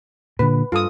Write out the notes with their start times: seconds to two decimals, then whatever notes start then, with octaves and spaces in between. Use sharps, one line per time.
0.39 A#2 D3 B4
0.72 G2 F4 A4 D#6